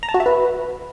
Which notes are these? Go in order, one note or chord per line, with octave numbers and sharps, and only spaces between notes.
A#5
A5
F#4
E5
B4